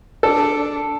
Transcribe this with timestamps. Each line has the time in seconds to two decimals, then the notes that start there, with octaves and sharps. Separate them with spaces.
0.23 D4 A4